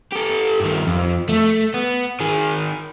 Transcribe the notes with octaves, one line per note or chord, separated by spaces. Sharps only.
G4 A4
G2 D#3
F2
A3
B3
D#3 G#4